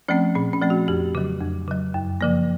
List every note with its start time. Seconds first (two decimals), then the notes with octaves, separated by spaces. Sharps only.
0.08 F3 A3 C4 C#4
0.35 A#2 C4
0.53 C#4
0.61 F3 A3 C4
0.70 F#4
0.88 F2 G4
1.15 C#3 F#3
1.41 F2
1.68 C#3 F#3
1.94 F#2
2.21 C#3 F3 A#3